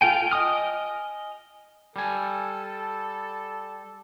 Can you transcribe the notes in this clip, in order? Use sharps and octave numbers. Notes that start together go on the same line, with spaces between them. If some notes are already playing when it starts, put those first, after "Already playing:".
F4 A4 G5 G#5
D#5 G#5 D#6 F6
G3 A4 G#5